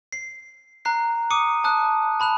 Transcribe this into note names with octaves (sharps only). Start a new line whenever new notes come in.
C7
A#5 F#6 C7
D6 D#6 C#7 D#7
A5 D#6 F#6
A5 B5 F#6 F7